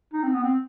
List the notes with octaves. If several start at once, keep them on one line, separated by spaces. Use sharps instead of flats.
D#4
C4
B3
C4